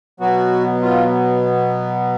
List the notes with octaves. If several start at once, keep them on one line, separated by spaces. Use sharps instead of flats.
B2 F#3 B3 F#4
F4